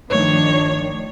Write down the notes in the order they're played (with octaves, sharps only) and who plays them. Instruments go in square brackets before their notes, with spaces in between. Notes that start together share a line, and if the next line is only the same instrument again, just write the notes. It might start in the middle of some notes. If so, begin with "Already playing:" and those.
[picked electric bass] G1 A3 [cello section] D#3 F3 D4 [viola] C#5